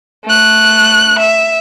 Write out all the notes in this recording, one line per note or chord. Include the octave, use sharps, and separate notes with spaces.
A3 F#6
E5